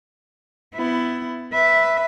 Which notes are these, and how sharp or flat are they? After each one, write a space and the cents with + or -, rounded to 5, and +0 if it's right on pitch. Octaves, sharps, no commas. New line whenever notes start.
B3 +25 E4 +10
B4 +0 E5 +0